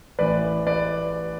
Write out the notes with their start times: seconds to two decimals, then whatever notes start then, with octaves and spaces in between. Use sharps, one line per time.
0.19 A1 A2 E3 B4 D5
0.67 B4 D5